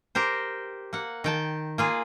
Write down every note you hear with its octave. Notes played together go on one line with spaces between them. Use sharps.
G4 A#4 C5
A#3 F#5
D#3 G5 A5
A#3 F4 G#4